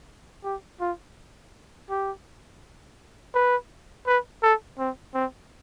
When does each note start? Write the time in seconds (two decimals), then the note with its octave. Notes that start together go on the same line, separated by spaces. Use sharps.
0.44 G4
0.81 F4
1.90 G4
3.35 B4
4.07 B4
4.43 A4
4.79 C4
5.14 C4